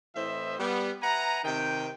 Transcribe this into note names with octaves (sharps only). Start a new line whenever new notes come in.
A2 E3 C4 C5 D#5 E5
G3 B3
B4 E5 F#5 G#5 A#5
C3 D#3 G5